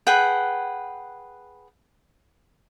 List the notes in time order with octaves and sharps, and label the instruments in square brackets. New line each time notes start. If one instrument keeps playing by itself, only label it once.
[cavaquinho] G#4 B4 F#5 G5